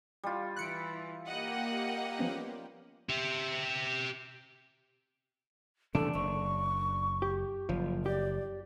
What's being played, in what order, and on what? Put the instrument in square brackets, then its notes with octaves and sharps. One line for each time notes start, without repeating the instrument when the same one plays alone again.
[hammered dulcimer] G3 F4
[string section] E3 [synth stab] F#6 C#7 D7
[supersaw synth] A#3 G4 [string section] D#5 F#5
[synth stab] F3 B3 C#4
[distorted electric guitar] G4 E5
[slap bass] C3 E3 A3 [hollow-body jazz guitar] D4 [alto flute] A4
[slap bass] F#1 [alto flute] C#6
[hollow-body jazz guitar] G4
[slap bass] F#1 [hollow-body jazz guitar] F3
[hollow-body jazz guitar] G4 [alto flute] D5